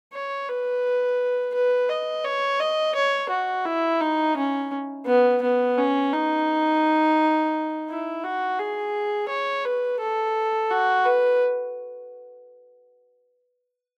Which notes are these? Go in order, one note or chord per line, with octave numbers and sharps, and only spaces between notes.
C#5
B4
B4
D#5
C#5
D#5
C#5
F#4
E4
D#4
C#4
B3
B3
C#4
D#4
E4
F#4
G#4
C#5
B4
A4
F#4
B4